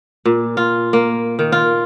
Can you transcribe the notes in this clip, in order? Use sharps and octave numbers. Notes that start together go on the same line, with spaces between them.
A#2
F4
A#3
D#3
F4